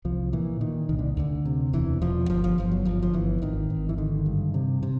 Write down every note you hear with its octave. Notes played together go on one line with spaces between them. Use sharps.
C2 F3
A#2 E3
A#2 D#3
C2 D#3
D3
D2 D3
C3
E1 E3
E1 F3
G1 F3
F3
G1 F3
F#3
G1 F3
F3
G1 E3
G#1 D#3
G#1
E3
D3 D#3
G2
C3
C3